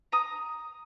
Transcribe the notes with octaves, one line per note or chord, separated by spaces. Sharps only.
A#5 D#6